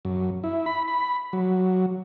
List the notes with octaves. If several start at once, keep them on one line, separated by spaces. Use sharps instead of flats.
F#2
E4
B5
B5
F#3